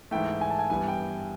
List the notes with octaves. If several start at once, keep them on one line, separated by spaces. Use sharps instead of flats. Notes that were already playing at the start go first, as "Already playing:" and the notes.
G#2 E3 A3 G5
G#5
A5
G#5
G2 E3 G3 B3 G#5
G5